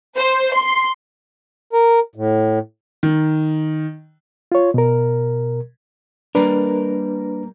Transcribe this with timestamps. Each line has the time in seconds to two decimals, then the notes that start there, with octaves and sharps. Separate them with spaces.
0.16 C5
0.53 C6
1.73 A#4
2.15 A2
3.03 D#3
4.52 F4 C#5
4.74 B2 A#4
6.35 G3 A#3 D4 A#4 B4